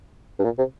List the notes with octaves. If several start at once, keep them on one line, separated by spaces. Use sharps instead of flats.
G2
A#2
C3